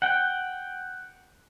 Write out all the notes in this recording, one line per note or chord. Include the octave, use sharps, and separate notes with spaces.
F#5 G5